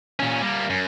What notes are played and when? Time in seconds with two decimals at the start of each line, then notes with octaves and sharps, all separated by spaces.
0.20 A#2 C#4
0.42 G3 A#3
0.70 F#2